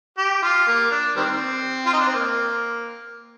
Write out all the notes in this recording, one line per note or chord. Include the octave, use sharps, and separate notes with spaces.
G4
F4
A#3
D4
D#3 G3 C4
F4
D#4
D4
C4
A#3